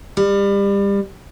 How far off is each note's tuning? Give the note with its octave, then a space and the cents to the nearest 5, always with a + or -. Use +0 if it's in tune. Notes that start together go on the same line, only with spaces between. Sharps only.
G3 +30